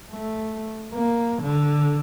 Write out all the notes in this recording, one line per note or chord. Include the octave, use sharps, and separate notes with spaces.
A3
A#3
D3